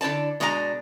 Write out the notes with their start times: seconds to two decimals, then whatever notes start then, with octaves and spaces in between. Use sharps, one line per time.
0.01 D3 E4 C5 D5 A5
0.40 B2 G#3 D4 D5 F#5 A#5